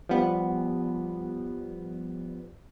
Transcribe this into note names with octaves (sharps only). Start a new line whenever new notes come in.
F3 G3 B3